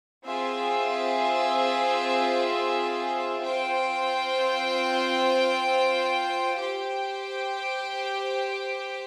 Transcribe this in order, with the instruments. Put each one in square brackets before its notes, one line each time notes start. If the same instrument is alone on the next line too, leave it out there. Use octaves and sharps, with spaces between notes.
[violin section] C4 F4 G#4 E5
C4 F4 C5 G5
G4 C5 G5